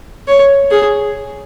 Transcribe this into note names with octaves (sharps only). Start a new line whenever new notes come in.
C#5
G#4